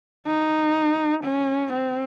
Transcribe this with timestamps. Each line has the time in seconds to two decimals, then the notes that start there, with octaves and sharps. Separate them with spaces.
0.26 D#4
1.24 C#4
1.73 C4